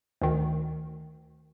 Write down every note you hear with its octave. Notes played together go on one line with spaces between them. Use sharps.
D2 D#3